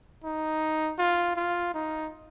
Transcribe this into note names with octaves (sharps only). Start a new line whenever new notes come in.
D#4
F4
F4
D#4